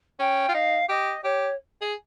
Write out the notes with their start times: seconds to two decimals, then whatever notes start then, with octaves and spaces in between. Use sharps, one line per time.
0.19 C#4 G5
0.49 F4
0.54 D#4 F5
0.89 G4 D#5
1.24 G4 C#5
1.82 G#4